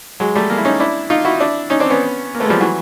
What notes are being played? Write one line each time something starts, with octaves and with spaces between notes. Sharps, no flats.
F#3 G#3
G3 A3
G#3 A#3
E4
C#4 D#4
D4 E4
D#4 F4
E4 F#4
D4 E4
C#4 D#4
C4 D4
B3 C#4
A#3
A3 B3
G#3
F3 G3
E3 F#3